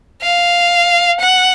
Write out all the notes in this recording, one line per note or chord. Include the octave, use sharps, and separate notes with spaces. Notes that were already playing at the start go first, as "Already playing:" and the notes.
F5
F#5